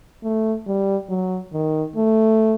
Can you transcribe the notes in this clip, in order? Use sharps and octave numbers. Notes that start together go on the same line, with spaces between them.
A3
G3
F#3
D#3
A3